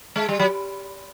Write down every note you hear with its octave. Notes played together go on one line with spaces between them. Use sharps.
G#3
G3
F#3